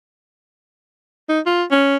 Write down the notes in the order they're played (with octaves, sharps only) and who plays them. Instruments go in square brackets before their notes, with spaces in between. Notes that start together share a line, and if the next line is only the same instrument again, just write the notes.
[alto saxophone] D#4
F4
C#4